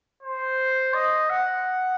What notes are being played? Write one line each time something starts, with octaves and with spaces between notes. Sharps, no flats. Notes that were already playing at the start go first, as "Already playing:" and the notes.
C5
D#5
F#5